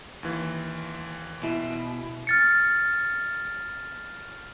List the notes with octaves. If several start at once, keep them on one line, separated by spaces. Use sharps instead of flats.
D#2 E3
B2 E4
F6 A6 C#7